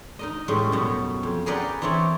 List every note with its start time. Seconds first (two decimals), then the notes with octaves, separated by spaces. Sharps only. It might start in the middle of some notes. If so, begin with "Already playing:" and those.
0.19 D#4 A#4 D#5
0.48 A2 G3 G#3 C#4 B4
0.72 F#2 B2
1.23 F2
1.46 G#4 A#4 B4 D5 F#5 G5
1.82 E3 C4 E4 C#5 D5